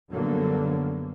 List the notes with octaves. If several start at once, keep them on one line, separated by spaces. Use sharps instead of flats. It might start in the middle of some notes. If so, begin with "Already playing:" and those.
F#2 D3 F#3 G3 A#3 B3